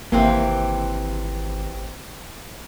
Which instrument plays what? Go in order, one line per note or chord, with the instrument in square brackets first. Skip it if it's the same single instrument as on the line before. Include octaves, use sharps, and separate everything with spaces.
[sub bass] G#1 [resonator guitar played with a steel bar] C3 E3 C4 [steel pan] A#3